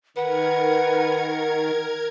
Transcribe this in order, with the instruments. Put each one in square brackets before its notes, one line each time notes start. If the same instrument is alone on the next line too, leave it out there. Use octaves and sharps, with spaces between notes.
[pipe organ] D#3 [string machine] A#4 G#6 [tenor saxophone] B4 [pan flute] F#5